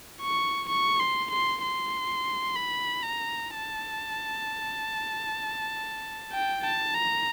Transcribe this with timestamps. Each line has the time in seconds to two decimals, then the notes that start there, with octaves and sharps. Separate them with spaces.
0.22 C#6
0.69 C#6
1.00 C6
1.31 C6
1.63 C6
2.56 B5
3.03 A#5
3.51 A5
6.32 G5
6.63 A5
6.94 A#5